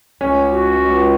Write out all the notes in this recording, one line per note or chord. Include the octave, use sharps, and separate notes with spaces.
C#2 C#4
F#4
C#2